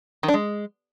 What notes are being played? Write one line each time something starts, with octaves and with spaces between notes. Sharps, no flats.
D#3
D4
G#3